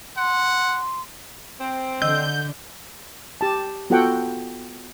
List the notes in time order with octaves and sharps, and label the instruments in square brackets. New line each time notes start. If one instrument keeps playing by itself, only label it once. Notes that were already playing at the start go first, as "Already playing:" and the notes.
[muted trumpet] F#5 [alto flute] C6
[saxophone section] C4
[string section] D3 [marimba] D#5 E6 [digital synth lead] G6
[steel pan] G4 A5
B3 F4 F#4 A4 F#5 G5